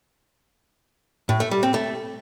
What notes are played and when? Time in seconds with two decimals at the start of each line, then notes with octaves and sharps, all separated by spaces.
1.29 A2
1.40 A3
1.51 G3
1.63 C4
1.74 A3